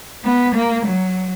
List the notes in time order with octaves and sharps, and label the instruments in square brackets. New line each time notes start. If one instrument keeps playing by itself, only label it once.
[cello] B3
A#3
F#3